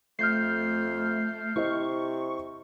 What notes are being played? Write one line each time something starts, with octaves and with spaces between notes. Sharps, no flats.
F2 A3 F6 G6 C7
C3 E4 C5 D#5 C#6